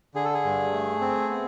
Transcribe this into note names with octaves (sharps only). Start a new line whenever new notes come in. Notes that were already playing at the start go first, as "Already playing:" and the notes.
D3 G#4
A4
G#4
G2
A3
C4
B3